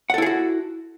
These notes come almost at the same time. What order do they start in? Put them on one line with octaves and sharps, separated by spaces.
F#5 A4 E4 G#4 F#4